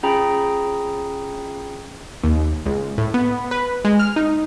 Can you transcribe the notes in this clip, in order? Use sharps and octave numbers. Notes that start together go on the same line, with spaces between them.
C#4 F4 G#4 G5 A#5 B5
D#2
C#2
A2
B3
B4
G#3
F6
D#4